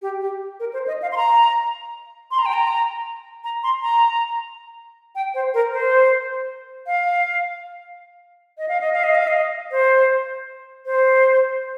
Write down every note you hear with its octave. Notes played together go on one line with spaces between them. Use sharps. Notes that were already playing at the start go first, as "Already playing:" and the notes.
G4
G4
A#4
C5
D#5
F5
C6
A#5
C6
A#5
G5
A#5
A#5
C6
A#5
G5
C5
A#4
C5
F5
D#5
F5
D#5
F5
D#5
F5
D#5
C5
C5